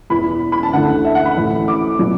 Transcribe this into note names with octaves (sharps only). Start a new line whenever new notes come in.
E1 E2 E3 B3 E4 B5
B5
A5
D2 D3 A3 E4 F#5
E5
F#5
B5
A1 A2 E3 A3
D6
B2 F#3